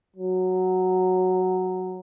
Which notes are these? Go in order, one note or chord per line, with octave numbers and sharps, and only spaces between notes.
F#3